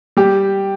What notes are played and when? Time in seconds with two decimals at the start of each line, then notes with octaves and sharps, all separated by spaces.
0.17 G3 G4